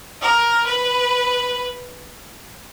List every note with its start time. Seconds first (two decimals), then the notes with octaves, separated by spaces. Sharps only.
0.20 A#4
0.66 B4